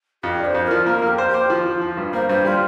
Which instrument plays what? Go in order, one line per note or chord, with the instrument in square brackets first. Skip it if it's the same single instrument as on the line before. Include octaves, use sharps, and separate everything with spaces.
[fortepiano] F2 [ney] G4
[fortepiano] D4
[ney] C5
[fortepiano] F2
[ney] A#4
[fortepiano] F3
[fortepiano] A#3 [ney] A#4
[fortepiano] A#3
[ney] G4
[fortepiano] C5
[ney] G4 [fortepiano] C5
[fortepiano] F3
F3
F3
G2
[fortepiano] A#3 [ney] C5
[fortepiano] G2 [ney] C5
[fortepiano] G3 [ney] F4